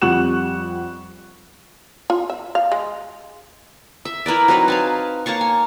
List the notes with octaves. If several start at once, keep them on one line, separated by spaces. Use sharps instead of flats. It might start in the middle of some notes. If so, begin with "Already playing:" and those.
F2 G3 F#5 C#6 F#6 E7
F4
E5
F5
G#3
E5
E4 A#4 B4 D5
F#3 C4 D#4 B4
F5 G#5 A5
A#3 C#5 A5 C#6
G#5